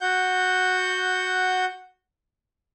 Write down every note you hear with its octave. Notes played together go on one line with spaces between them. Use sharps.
F#4 F#5 G6